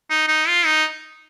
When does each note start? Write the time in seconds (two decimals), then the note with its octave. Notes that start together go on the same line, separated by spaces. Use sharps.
0.10 D#4
0.28 D#4
0.48 F4
0.65 D#4